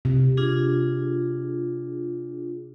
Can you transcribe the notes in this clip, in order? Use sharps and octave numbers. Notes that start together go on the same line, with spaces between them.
C3
D4 F4 G#4